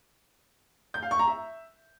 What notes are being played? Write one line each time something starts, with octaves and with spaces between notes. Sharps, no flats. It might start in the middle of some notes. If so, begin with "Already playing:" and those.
G6
F5
C#6
A#5
E5